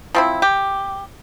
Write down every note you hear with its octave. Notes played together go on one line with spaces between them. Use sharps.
F3 C4 E4
G4